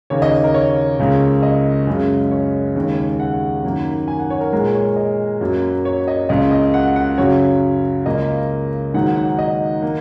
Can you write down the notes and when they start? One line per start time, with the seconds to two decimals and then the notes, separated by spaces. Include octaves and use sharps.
0.10 D#2 C#3 A#3 C#5
0.22 D#5
0.44 A#4
0.54 C#5
0.99 C#2 C#3 A#3
1.43 D#5
1.87 F#2 C#3 G#3
2.31 C#5
2.76 D#2 C#3 G#3
3.20 F#5
3.64 F#2 D#3 A#3
4.08 G#5
4.19 F#5
4.30 C#5
4.41 A#4
4.53 A#2 G#3 A#4
4.74 C#5
4.96 D#5
5.41 F#2 F#3 A#3
5.85 C#5
6.08 D#5
6.29 C#2 C#3 A#3 D#5
6.51 D#5
6.74 F#5
6.96 F#5
7.18 F#2 C#3 F#3 C#5
8.06 C#2 C#3 A#3 D#5
8.94 G#2 D#3 F#3 A#3 F#5
9.16 F#5
9.39 D#5
9.82 D#3 A#3